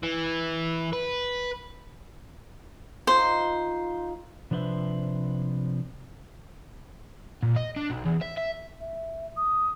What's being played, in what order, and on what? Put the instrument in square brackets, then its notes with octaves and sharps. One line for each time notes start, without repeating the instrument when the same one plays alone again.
[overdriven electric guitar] E3
B4
[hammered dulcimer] D#4 F4 [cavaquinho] C5
[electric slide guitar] C3 F3 D4 B4 C5 E5
[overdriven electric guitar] A#2
D#5
D4
B1
E2
E5
E5
[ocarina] E5
D#6